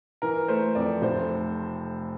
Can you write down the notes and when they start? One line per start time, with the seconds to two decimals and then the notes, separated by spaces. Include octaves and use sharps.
0.22 E3 A#4
0.48 A3 C5
0.75 F2 D5
1.02 F1 C5